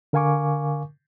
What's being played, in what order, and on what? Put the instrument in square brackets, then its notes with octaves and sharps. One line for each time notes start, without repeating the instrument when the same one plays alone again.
[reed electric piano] D3 A#4 F5 G#5 C#6 D6